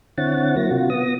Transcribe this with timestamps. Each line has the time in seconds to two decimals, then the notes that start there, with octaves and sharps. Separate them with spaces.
0.18 D3 C4 E4 C#5 F#5 A6
0.56 F#3 A#3 E4 A#6
0.71 C3 F4 F#4
0.90 B3 D#6 A#6